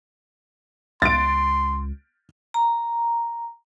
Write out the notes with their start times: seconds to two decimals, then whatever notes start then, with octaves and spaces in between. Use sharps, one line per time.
1.02 C#2 C6 A6 D7
2.54 A#5